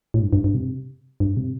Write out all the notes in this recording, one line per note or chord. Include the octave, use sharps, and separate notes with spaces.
A2
G2
G2
G2
C3
G2
C3